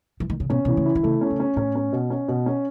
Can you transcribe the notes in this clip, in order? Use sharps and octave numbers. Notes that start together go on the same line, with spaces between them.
E3
D#3
C#3
B2 C#4
B2 E3
C#3
E4
D#3
C#3 A3
C#4
C#3
C#4
A2 C#4
C#4
B2
C#4
B2
C#4